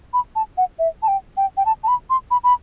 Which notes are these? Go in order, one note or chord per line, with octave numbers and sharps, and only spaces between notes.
B5
A5
F#5
E5
A5
G5
G5
G5
A5
A5
B5
C6
B5
B5